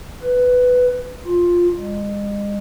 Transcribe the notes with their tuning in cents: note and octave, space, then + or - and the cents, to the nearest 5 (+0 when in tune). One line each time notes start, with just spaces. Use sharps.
B4 +10
F4 +5
G#3 -35